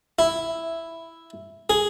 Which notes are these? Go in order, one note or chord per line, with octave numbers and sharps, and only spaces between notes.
E4
G#4